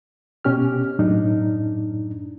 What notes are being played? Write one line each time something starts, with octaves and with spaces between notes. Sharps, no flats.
B2 C#4 G4 F6
F#2 A2 D4 D#4